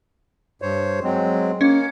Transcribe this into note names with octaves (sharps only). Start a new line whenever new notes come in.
G2 C5 C#5
F#3 G#3 C4
A#3 C#4